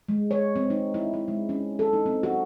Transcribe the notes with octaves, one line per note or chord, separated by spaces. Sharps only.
G#3
C#5
C4
D#4
E4
E4
G#3
C#4
A4
D#4
C4
F#4